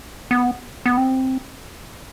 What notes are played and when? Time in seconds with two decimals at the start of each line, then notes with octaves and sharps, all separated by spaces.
0.31 B3
0.86 B3
0.97 C4